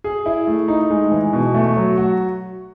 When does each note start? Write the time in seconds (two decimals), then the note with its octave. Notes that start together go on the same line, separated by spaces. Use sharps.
0.04 G#4
0.26 E4
0.47 A3
0.68 D#4
0.91 G#3
1.11 E3
1.33 B2
1.54 A3
1.76 F#3
1.97 F#4